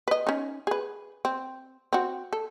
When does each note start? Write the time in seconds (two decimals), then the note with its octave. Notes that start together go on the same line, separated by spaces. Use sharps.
0.08 B4 D#5
0.27 C#4 D#4
0.67 G#4 B4
1.25 C4
1.93 C4 F#4
2.33 A4